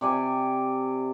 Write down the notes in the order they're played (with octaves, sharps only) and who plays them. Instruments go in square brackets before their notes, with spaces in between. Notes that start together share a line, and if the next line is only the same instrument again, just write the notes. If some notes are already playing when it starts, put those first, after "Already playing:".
[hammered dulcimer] C3 D5 G#5